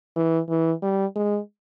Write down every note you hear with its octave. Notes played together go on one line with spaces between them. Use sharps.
E3
E3
G3
G#3